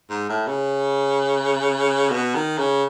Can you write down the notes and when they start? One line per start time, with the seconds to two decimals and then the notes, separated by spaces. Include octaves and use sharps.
0.10 G#2
0.29 A2
0.47 C#3
2.10 B2
2.35 D#3
2.58 C#3